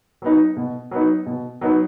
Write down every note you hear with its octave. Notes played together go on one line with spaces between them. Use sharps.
F#3 B3 D#4
B2
F#3 B3 D#4
B2
F#3 B3 D#4